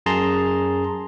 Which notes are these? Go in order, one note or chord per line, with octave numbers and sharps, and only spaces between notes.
F#2 G#4 A5 A#5 C6